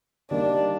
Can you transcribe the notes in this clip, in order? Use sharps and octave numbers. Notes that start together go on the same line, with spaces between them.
D#3 G3 A#3 D4 D#4